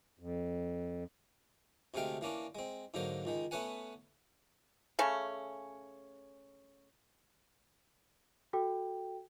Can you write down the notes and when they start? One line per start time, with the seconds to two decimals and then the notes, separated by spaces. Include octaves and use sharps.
0.19 F2
1.94 D2 C3 G#3 A3 F5 G5
2.21 E3 A#3 C#4 D4
2.55 G#3 C4
2.94 G#2 D3 F#3 A#3 C5
3.25 C#2 D#3 G#3
3.51 A3 B3 C#4 B4 F#5 G#5
4.99 C#3 A3 C#4
8.53 F#4 A4 G5